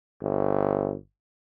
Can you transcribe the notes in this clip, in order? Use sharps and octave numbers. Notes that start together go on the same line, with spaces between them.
G1